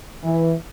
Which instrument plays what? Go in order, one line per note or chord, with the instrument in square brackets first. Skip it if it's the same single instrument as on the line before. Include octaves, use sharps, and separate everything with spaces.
[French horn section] E3